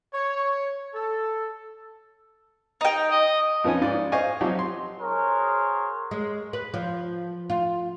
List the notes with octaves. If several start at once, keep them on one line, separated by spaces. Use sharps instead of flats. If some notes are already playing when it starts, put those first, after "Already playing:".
C#5
A4
D#4 G5
D#5
F2 F3 B3 C#4 D#4 G#5
G#2 F4 D5
C5 D#5 F5 G#5 C#6
F3 F#3 C4 D#4 F#4 G4
C6
F#4 G#4 A#4 C5 C#5
G#3
B4
F3
F4